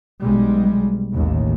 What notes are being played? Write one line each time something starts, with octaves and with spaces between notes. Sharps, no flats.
B1 G3 G#3
A1 D#2